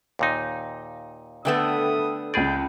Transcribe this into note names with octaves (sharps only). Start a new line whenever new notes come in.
D#2 A#2 D#4
D3 A3 B3 B4 G5 D#6
C#2 G#4 D5 B5 G6